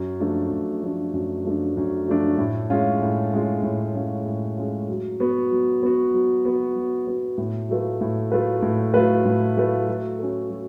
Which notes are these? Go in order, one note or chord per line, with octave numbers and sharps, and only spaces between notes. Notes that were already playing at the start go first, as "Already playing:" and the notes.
Already playing: F#2
F3 A3 D4
F#2
F3 A3 D4
F#2
F3 A3 D4
F#2
F3 A3 D4
A2
G#3 C#4 F4
A2
G#3 C#4 F4
A2
G#3 C#4 F4
A2
G#3 C#4 F4
F#3
B3 F#4
F#3
B3 F#4
F#3
B3 F#4
F#3
B3 F#4
A2
F#3 A3 F4 B4
A2
F#3 A3 F4 B4
A2
F#3 A3 F4 B4
A2
F#3 A3 F4 B4
F#3
C#4 F#4 A4
F#3